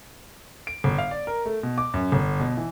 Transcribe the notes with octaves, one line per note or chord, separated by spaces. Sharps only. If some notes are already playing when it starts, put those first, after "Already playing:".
D7
G1
F5
D5
A#4
A3
B2
D6
F#2
G1
B2
E3